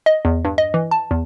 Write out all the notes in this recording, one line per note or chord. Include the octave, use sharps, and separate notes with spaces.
D#5
E2
G2
D#5
E3
A5
E2